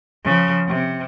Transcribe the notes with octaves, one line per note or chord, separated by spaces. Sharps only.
C#3 F3
C3